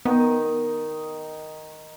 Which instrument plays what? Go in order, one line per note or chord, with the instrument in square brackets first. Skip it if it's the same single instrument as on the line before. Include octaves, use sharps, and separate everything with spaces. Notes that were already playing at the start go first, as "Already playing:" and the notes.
[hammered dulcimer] D#3 D#4 [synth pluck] B3